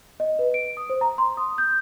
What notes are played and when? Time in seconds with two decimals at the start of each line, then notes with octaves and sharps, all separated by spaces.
0.20 D#5
0.39 B4
0.54 D7
0.77 D#6
0.90 C5
1.01 A#5
1.18 C6
1.37 D#6
1.58 G6